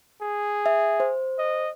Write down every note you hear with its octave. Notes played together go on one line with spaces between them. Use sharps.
G#4
E5
C5
D#5